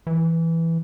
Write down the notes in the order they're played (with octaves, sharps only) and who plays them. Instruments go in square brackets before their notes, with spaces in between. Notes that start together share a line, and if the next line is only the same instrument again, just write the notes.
[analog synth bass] E3